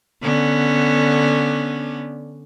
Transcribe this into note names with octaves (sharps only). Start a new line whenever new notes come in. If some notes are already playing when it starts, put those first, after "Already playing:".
D3 B3 C#4